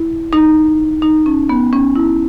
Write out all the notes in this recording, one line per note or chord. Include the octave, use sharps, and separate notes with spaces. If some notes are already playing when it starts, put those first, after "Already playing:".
Already playing: E4
D#4
D#4
C#4
B3
C#4
E4